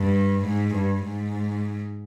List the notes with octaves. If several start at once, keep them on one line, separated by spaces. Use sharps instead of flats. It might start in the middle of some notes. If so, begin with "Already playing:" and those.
Already playing: G2
G#2
G2
G#2